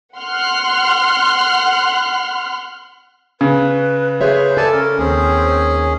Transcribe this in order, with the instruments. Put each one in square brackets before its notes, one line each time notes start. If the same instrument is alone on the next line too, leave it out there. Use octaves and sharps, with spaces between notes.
[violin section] F#5 C6 F6 F#6
[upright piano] C#3 [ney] B4
[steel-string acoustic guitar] G#4 C#5 E5 [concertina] C5
[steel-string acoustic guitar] A4 [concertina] D5 G#5 A5
[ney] C#4 [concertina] A#4
[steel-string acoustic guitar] D#2 [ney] C4 [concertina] C#4 G#4